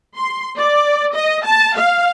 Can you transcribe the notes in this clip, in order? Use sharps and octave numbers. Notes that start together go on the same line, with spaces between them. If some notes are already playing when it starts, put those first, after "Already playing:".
C6
D5
D#5
A5
F5